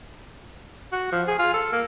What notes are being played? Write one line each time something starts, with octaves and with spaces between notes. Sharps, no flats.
F#4
F3
G#4
F4
A4
A#3